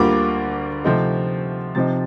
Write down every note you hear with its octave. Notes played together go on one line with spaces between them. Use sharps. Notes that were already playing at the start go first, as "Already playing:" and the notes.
Already playing: D2 D3 G3 A#3 F4 D6
C3 F3 A3 C4 D#4
C3 F3 C4 D#4 A6